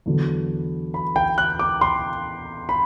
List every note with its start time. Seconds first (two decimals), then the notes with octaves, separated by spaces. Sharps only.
0.06 E2 D3 F#3
0.94 B5
1.16 G5
1.38 F#6
1.59 D6
1.81 C6
2.69 B5